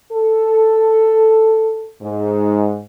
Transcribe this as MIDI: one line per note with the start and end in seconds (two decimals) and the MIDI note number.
0.12 1.90 69
2.02 2.81 44